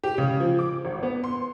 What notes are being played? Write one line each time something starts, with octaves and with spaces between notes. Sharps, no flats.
G4
C#3
F3
D6
G#1
B3
C6